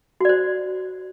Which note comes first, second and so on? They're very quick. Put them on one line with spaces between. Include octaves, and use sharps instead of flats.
F#4 D5 C5